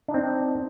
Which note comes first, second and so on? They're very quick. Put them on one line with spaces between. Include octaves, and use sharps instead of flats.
D4 D#4 C4